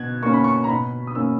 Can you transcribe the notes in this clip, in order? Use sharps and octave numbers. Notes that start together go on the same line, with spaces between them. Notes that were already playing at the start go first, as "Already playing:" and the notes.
Already playing: B2 F#6 G#6
A#3 C#4 C#6
B5
C#6
A#5
B2 B5
D#6
A#3 C#4 E6